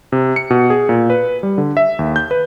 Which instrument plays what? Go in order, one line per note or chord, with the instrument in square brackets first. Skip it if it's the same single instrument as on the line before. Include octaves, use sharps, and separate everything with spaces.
[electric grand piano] C3
C#7
B2
G#4
A#2
B4
G3
D3
E5
D#2
G6
B4